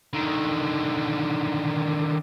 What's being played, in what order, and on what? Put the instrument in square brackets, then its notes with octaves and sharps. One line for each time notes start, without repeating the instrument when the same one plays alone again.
[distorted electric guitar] D3 D#3